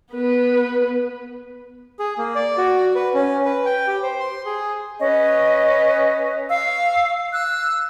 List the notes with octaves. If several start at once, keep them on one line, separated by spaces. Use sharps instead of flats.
B3 B4
G#4
A#3
D5
F#4
B4
C#4
B4
G5
G4
C5
C6
G#4
C#4 B4 D#5
F5 C#6 E6
E6 F#6